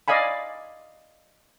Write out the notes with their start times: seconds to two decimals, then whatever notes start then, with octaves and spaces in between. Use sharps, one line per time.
0.08 D5 D#5 F5 G#5 B5